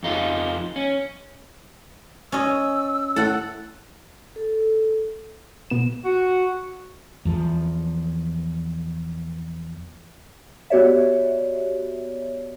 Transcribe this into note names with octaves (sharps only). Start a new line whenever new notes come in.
F2 D#4 F4
C#4
C#4 D#5 E6
A2 A4 F#5
A4
B2 B3 E7
F#4
E2 F3
B3 F#4 G4 C#5 D5 E5